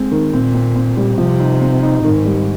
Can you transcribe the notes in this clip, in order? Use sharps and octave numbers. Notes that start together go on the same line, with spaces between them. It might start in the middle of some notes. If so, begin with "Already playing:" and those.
Already playing: G#3 C4
D#3
A#2 C4
C4
C4
G3
C3 F3
D#4
C4
D#4
G#2 D#3
G3